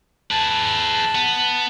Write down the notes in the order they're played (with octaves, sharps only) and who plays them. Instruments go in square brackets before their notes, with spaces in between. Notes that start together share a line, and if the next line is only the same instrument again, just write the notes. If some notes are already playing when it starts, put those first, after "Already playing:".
[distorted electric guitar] G#4 B4 [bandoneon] A5
[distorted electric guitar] B3